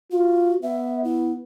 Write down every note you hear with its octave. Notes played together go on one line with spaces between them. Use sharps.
F4 F#4
B3 E5
E4